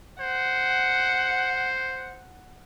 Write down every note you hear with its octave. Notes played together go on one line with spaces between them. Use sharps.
C5 F#5